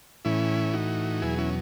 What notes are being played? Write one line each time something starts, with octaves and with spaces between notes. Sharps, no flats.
A2 E3 C#4 E4
D#4 F#4
E2 B2 F#3 E4 G#4
C#4 E4